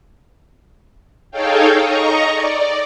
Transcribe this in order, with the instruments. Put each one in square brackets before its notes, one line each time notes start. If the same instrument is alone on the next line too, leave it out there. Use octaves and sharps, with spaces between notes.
[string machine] D#4 G#4 A4 C#5 F5 G5
D#5 A#5 C#6
D5